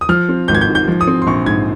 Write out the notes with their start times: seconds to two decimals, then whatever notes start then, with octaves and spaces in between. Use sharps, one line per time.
0.01 D#6
0.09 F3 F6
0.29 C4
0.48 G#1 G6
0.55 G#6
0.61 G6
0.68 G#2
0.75 G6
0.88 F3
1.01 D#6
1.07 C4
1.22 C6
1.27 A#1 C#6
1.46 G#2 G#6